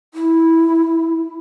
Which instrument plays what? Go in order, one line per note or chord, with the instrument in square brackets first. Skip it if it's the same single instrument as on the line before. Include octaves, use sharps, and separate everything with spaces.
[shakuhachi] E4